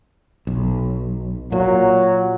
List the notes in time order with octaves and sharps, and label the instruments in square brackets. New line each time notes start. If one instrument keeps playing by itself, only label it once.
[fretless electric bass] B1
[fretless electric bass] A#2 [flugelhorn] F#3